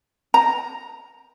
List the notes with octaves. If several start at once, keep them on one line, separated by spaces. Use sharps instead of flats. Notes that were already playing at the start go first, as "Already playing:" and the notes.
A#5